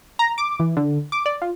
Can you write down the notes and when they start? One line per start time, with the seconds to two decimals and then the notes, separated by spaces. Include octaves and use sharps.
0.19 A#5
0.38 D6
0.60 E3
0.77 D3
1.12 D6
1.26 D5
1.42 F4